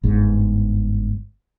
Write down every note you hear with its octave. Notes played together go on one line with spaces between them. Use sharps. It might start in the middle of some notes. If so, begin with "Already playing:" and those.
G1 G#2